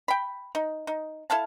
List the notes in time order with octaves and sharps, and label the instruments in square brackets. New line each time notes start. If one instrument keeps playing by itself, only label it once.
[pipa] G5 B5
D#4
D#4
E4 A4 F5 A5